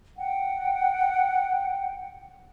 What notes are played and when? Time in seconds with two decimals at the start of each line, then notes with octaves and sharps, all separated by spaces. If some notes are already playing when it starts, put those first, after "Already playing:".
0.18 F#5 G5